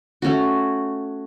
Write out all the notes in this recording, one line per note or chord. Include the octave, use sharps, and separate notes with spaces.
A3 C#4 F#4